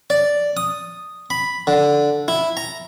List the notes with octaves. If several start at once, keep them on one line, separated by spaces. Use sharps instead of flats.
D5
D#6
B5
D3
E4
A#5